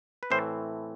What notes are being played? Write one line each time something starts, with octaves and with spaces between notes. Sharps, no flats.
B4
A2 E3 A3 C4 C5